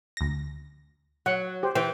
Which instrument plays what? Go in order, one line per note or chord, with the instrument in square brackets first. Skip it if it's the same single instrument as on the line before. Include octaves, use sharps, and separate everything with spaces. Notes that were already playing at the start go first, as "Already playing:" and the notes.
[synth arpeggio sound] D2 A#6
[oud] F#3 [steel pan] F#5
[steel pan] G4 C5
[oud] E3 [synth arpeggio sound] C5 [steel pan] G5